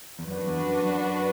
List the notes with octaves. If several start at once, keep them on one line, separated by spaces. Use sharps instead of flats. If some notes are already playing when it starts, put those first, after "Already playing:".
E2
F#2 D4 F#4 B4
E2
F#2
F#2